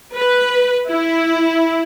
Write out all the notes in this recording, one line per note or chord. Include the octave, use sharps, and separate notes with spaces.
B4
E4